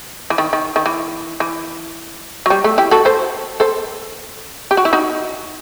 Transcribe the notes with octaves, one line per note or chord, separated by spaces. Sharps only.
E3
D#3
D#3
D#3
E3
E3
F#3
G3
A3
E4 G4
F#4 A4
A4 C5
A4 C5
G4
F#4
E4
D#4 F#4